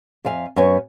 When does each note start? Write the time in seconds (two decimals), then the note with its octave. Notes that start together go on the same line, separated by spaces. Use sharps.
0.25 F2 E5 F5 G#5
0.56 F#2 B3 B4 C#5 G#5